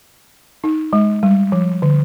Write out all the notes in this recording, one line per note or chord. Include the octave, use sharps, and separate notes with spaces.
D#4
G#3
G3
F3
D3